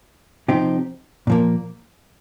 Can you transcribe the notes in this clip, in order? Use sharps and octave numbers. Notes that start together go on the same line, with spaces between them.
C3 F3 C4 D#4 G4
A#2 F3 A#3